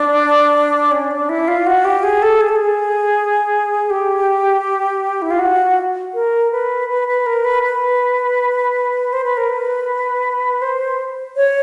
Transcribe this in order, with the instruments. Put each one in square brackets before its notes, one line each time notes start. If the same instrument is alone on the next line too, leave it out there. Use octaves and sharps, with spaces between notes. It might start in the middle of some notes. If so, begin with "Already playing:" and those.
Already playing: [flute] D4
C#4
D4
E4
F4
F#4
G4
G#4
A4
G#4
A4
G#4
G4
E4
F4
F#4
A#4
B4
B4
B4
A#4
B4
B4
C5
B4
A#4
B4
C5
C#5